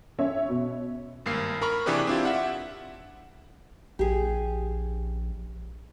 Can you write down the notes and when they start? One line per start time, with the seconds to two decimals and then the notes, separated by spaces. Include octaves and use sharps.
0.19 C#4 C#5 E5
0.49 B2
1.26 G#1 G2 A#3 C7
1.62 A#4 A#5 B5 C#6
1.86 C3 E3 D4 G4 G#4 B4
2.07 C4 D4 E4 F4 G4
2.25 E5 F#5
3.99 A#1 G4 G#4